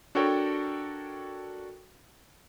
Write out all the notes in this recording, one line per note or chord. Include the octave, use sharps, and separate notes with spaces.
D4 F#4 A4 A#4 C#5 G5